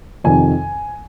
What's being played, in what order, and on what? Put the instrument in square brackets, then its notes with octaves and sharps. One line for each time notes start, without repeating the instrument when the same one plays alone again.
[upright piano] F2 C3 D#3 G#5